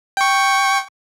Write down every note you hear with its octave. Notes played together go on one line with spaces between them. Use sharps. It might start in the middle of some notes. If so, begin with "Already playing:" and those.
G5 C#6